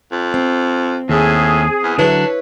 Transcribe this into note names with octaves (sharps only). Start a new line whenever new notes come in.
F2
C4
D#2 A2 G#4
E2
D3 F#3 D4 E4 B4 C#5